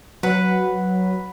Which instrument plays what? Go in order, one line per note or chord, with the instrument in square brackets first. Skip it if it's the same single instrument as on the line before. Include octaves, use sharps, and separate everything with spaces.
[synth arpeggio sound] F#3 [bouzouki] B4 F#5